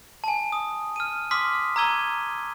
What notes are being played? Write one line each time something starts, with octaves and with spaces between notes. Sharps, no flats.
G#5 A5
D#6
F6 D#7
C6 D6 D#6 F6 B6
A#5 D6 E6 G#6 D#7 G7